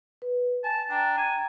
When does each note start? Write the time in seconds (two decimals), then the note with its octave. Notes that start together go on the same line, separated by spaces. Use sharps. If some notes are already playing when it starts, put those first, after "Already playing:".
0.22 B4
0.64 G#5 A5
0.90 D4 G5 A#5
1.18 G#5